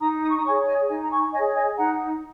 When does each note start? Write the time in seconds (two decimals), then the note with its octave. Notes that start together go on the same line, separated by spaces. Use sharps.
0.01 D#4 A#5 D#6
0.22 D#6
0.30 C#6
0.37 A#5 D#6
0.45 C#5 G#5 C#6
0.48 G#4
0.67 D#5 G#5
0.89 D#4 D#5 G#5
1.03 A#5
1.11 G#5 C#6
1.33 G#4 C#5 D#5 G#5
1.55 D#5 G#5
1.77 D#4 F#5 A#5